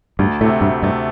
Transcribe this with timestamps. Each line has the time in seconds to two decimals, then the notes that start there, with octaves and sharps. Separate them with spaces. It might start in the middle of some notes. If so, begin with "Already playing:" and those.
0.19 D2 G2
0.41 A2 C3 A3
0.61 D2 G2
0.82 G2 C3 A3